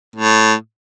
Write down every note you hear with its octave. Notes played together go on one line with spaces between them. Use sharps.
A2